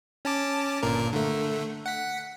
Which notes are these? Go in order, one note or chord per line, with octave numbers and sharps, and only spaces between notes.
C#4 A5 D6
G1 A#2 A#4
D3 A3
F#5 B6